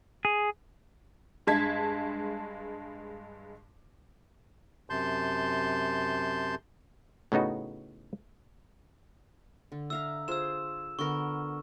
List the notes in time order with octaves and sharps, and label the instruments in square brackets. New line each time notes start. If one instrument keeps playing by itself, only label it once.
[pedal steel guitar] G#4
[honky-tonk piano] G2 G#3 A5 G#6 B6
[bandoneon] F#2 C3 A5 C6 G6
[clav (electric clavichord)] A2 C#3 B3 D#4 F#4
[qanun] D3
[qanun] E5 F5 A#5 [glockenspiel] E6
[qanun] F4 G#4 C5 [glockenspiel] E6 E7
[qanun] D3 B3 A#4 [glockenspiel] C#6